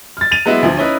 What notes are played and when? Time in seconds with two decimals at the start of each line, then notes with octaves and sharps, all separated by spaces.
0.17 F6 A6
0.31 A6 D#7 F7
0.46 F#3 G#3 B3 E4 D#5 E5
0.63 D2 F3
0.77 C#4 D#4 E4 B4